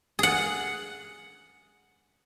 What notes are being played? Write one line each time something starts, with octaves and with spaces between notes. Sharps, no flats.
G#4 F#5